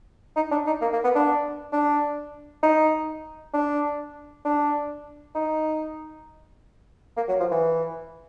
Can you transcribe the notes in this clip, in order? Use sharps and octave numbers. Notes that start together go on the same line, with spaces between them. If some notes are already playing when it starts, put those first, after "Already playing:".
D#4
D4
D#4
A#3
A#3
B3
D4
D4
D#4
D4
D4
D#4
A#3
F#3
F3
E3